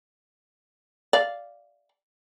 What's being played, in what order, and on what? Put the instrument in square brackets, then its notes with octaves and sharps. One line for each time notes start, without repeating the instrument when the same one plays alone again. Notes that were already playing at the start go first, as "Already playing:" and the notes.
[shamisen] D5 F5